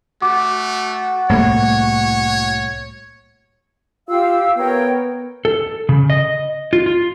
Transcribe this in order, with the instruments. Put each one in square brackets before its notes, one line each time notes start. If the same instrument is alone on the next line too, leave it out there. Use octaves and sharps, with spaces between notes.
[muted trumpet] A3 [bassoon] F#4 [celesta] D6
[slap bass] C2 A2 A#3 [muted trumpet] C#5
[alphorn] F4 [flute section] G4 F5 E6
[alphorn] B3 [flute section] A#4 C#5 G5
[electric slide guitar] A4
C#3
D#5
F4
F4